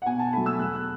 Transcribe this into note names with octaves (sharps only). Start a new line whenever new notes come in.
F#5
B2 G#5
A5
F#3 A3 B5
E6
E2 F#6
F#6